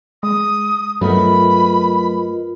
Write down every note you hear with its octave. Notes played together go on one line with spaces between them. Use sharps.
G#3 D#6
G2 F#3 A3 B3 F4 A#4 D#5 B5